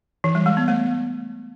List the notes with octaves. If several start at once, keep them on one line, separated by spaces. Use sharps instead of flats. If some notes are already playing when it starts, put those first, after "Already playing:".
E3
G3
G#3
B3
A3